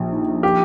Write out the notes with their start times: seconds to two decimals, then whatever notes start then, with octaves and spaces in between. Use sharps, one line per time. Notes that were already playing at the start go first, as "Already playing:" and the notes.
Already playing: A#1 A#2 G3
0.12 D#4
0.43 G4